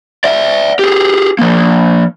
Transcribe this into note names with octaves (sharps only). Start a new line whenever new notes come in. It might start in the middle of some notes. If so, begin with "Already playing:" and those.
D5 E5
G4 G#4
F3 A#3